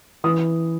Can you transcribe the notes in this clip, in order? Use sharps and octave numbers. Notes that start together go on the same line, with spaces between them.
E3 D#6